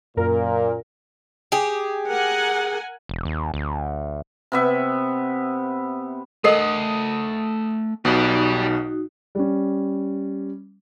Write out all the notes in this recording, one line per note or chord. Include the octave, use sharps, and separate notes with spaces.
F#2 A#2 A#4
G4 G#4
A#4 F#5 G#5
E1
D#2
D2
C3 B3 E5
A3 A4 A#4 D#5 F#5 D#6 C7
B1 B2 D#4 F#4 G4 D5
G3 C#4